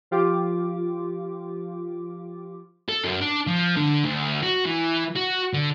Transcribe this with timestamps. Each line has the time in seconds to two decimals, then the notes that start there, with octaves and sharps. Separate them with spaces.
0.11 F3 F4 G4 D6
2.89 A4
3.04 F#2
3.21 D4
3.47 F3
3.77 D3
4.05 D2
4.43 F#4
4.66 E3
5.16 F#4
5.53 D3